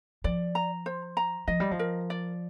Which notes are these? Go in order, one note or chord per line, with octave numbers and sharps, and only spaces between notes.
F3 D5
A#5
C5
A#5
F3 D#5
G3
F3
A#4
D5